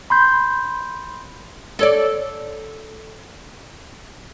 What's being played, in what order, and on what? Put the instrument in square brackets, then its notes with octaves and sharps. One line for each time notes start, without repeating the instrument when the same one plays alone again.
[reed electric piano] B5 C6 G6
[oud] A4 C#5 D5